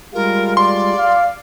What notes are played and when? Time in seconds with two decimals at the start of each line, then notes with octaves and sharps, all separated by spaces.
0.14 G3 G#3 F4 A#4
0.57 D5 C6
0.98 F5